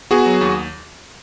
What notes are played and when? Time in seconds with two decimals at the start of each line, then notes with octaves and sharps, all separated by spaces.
0.11 B3 F#4 G#4
0.26 F#3
0.41 D#2